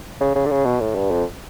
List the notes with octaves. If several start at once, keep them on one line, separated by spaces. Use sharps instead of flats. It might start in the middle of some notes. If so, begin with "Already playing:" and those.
C#3
C#3
D3
C#3
B2
A2
G2
F2